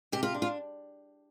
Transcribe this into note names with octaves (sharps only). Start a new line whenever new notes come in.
C3 G4
F4
D4
F4